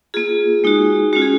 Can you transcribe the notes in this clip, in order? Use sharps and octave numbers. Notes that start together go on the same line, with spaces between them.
A#3 F4 G#4
G#3 D#4 F#4
G#3 C#4 F4 F#4
G#4